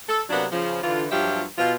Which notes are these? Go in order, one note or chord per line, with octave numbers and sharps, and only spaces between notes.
A4
C3 F#3 A#3 B3 D4
C#3 F3
D3 E3 F4
G2 F3 F#3 F4 G4 E5
B2 F4